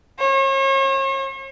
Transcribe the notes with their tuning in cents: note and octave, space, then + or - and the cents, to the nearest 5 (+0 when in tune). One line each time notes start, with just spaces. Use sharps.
C#5 -40